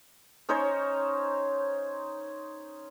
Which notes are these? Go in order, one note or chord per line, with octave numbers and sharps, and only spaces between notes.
C#4 D#4 C5 C#5